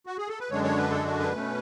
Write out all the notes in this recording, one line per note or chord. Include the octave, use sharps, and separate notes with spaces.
F#4
G#4
A4
B4
F#2 D3 G#3 D4 C#5
C#5
B4
A4
F#4
B4
B2 A3 C#4